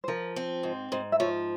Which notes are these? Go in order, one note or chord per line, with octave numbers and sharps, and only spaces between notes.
C5
F3 A#4
C4
G#2
G#2 C5
E5
F3 C#5